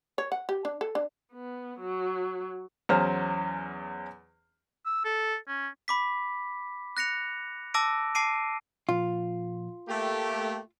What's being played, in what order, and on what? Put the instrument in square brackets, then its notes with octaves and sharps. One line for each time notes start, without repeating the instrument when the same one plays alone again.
[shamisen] C#5
F#5
G4
D4
A4
D4
[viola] B3
F#3
[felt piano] E2 F#3 C#4 C5 F6
[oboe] E6
A4
C#4
[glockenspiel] B5 D6 B6
F#6 A#6 C#7 F7
A5 D6 E6 A#6 D7
A5 D6 C7 D7 D#7
[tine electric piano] A#2 F3 [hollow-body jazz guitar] F4
[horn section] A3 A#3 G4 [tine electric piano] G5